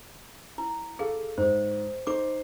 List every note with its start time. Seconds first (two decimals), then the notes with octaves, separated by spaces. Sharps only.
0.58 E4
0.99 G#4 A4 F5
1.38 G#2 C5
2.07 D#4 C5 D6